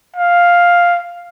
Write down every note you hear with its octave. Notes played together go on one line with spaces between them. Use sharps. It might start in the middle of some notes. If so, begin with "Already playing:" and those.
F5